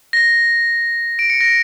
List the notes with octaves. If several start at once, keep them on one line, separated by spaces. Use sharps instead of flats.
A#6
D7
C#7
A#6